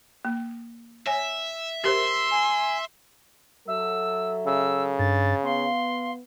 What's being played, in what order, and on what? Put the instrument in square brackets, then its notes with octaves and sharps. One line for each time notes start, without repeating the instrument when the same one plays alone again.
[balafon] A#3
[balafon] C#5 G#5 [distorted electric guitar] E5
[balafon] G4 A#4 C5 [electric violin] C6
[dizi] G#5
[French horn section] F#3 A4 [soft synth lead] E5 [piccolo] E6
[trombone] C#3 [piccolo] E6
[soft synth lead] G2 [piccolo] A6
[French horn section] B3 [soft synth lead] F5 [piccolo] C6